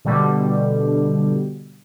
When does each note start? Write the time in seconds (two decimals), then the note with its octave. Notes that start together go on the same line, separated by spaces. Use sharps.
0.05 B2 D3 G3